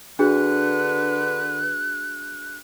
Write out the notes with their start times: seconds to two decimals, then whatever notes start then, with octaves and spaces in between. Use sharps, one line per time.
0.19 D3 D4 F#4 G#4 B4 F#6